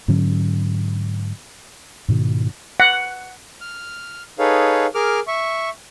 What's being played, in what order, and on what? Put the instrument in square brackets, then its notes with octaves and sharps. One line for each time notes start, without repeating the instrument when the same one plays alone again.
[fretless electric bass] G#2 D3 F#3 C#4
G#2 B2 D#3
[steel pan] F#5
[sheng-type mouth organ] F6
D#4 G#4 A4 B4 C#5 F5
G#4 A#4 D6 F6
E5 C#6